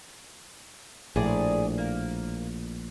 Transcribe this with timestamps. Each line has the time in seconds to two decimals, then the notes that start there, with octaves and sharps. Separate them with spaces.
1.16 A#1 A2 G#4 D5
1.78 A#3